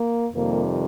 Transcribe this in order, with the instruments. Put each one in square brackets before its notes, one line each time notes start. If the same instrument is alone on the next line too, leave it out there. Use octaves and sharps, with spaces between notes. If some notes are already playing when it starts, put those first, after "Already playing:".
Already playing: [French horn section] A#3
F2 C3 D#3 G3 A#3